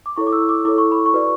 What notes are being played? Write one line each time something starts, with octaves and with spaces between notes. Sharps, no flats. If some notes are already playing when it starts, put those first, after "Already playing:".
D6
E4 A4 C#5 C#6
D6
E6
D6
E4 A4 C#5 D6
C#6
B5
C#6
F#4 B4 D5